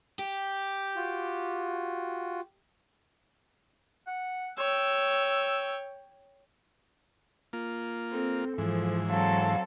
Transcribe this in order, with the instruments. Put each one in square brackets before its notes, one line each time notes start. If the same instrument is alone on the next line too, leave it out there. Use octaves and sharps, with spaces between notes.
[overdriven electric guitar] G4
[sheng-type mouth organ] F4 F#4
[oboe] F#5
[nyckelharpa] C#5 G5 [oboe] E6
[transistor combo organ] A#3 F4
[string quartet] C4 [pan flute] A4
[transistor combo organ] G#2 E3 [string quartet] F3
[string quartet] F#3 C4 A4 [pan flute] F5